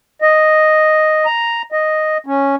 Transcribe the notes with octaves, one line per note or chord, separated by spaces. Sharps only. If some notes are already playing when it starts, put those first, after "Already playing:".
D#5
A#5
D#5
C#4